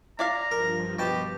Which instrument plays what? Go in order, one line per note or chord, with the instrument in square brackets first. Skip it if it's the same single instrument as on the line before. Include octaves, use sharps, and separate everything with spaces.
[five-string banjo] E4 D5 F5 [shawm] A#5
[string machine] G2 F3 [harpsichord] A#4
[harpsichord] B2 G5 A5 [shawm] G4